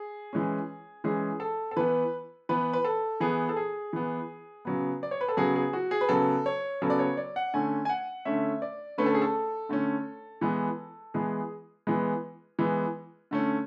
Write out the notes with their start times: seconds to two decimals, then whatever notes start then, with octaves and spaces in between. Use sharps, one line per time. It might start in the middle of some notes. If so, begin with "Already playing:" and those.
Already playing: G#4
0.33 E3 G#3 C#4
1.04 E3 G#3 C#4 G#4
1.40 A4
1.71 A4
1.76 E3 B3 B4
2.49 E3 B3 B4
2.73 B4
2.84 A4
3.20 E3 B3 G#4
3.49 A4
3.56 G#4
3.93 E3 B3
4.65 C#3 F#3 B3
5.03 D5
5.11 C#5
5.21 B4
5.28 A4
5.37 C#3 F#3 B3 G#4
5.56 G#4
5.73 F#4
5.91 G#4
6.01 B4
6.09 C#3 F#3 B3 A4
6.46 C#5
6.82 C#3 F#3 B3 A4
6.90 D5
6.99 C#5
7.17 D5
7.36 F#5
7.54 D3 A3 C#4 G#5
7.85 G#5
7.89 F#5
8.25 D3 A3 C#4 E5
8.62 D5
8.98 D3 A3 C#4 B4
9.06 A4
9.14 G#4
9.22 A4
9.69 D3 A3 C#4
10.41 E3 G#3 B3
11.14 E3 G#3 B3 G#4
11.87 E3 G#3 B3
12.59 E3 G#3 B3
13.31 D3 A3 C#4